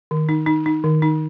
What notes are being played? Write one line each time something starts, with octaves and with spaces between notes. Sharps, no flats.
D#3
D#4
D#4
D#4
D#3
D#4